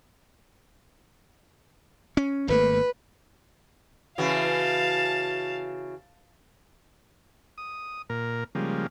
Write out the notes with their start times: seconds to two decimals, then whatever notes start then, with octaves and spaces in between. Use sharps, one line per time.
2.17 C#4
2.48 G#1 A3 A#3 B4
4.18 C#3 E3 F#4 F5 A5
7.58 D#6
8.10 A#2 A#4
8.55 C#3 F3 G3 G#3 A#3